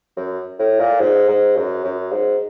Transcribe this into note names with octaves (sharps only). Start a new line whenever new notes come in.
F#2
A2
A#2
G#2
G#2
F#2
F#2
G#2